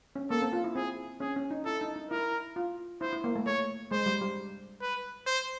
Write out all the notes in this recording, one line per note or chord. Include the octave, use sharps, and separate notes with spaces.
C#4
A#3 A4
C4
F4
E4
C4 G#4
C#4 G#4
C#4
D#4
E4 A4
D#4
D#4
E4 A#4
F4
E4 C5
E4
A#3
A3
A3 C#5
G#3 C5
G3
G3
B4
C5